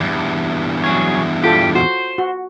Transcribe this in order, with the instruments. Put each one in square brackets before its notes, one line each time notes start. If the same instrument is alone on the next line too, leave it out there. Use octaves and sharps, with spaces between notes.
[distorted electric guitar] E2 G2
[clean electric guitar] F#3 G#4 C#5
[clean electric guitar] G3 G4 [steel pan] F4 A4
[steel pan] F#4 [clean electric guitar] C5
[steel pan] F#4